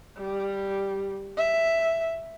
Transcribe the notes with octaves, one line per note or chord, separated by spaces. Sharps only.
G3
E5